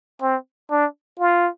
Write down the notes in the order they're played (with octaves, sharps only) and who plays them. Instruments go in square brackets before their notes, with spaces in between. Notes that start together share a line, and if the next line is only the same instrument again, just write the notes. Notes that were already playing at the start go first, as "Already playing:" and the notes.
[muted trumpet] C4
D4
F4